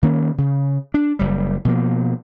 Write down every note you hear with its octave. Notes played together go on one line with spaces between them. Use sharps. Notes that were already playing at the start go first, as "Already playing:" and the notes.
D#3 A#3 C#4
C#3
D4
F#1 G3
B2 F3 A#3